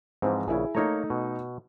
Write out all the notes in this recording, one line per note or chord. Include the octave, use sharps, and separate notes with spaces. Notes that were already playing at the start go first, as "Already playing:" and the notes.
G#2 E3 F3 C4
A#1 C#3 E4 G#4
A3 A#3 D#4 C#5 A#5
B2